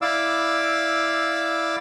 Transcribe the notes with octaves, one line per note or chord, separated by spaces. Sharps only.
E4 D5 F5 D6 E6